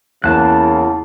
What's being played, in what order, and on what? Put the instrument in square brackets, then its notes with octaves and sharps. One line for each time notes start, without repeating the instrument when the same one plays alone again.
[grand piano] E2 A#3 [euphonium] C#3 [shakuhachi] E4 [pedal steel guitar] A5 F#6